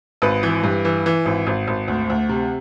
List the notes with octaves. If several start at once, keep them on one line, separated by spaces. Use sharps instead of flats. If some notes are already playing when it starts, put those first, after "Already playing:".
G#1 B4
E3
G2
E3
E3
G#1
G#1
G#1
D2
D2
C3